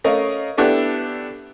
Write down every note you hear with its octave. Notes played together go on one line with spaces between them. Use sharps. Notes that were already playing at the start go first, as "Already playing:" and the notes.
A3 C#4 A#4 D#5 F5
A3 B3 D4 E4 G4 A4